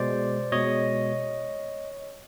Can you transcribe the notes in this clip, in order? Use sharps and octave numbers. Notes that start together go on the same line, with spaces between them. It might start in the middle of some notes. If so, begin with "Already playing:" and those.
Already playing: B2 G#3 C5 D5
B2 G#3 C#5 D#5